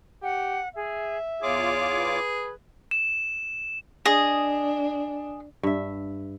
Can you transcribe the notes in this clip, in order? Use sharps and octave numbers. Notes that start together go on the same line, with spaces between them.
G4 F#5
G#4 E5
E2 F4 G#4 C#5 D6
B4
E7
D4 G#4 D#5
G2 E5